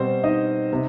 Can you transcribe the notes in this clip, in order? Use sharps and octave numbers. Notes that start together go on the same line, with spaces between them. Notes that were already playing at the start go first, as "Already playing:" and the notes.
Already playing: B2 G3 C4 C5
D#4 D#5
C3